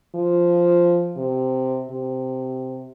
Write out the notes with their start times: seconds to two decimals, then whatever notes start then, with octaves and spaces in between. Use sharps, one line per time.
0.15 F3
1.17 C3
1.91 C3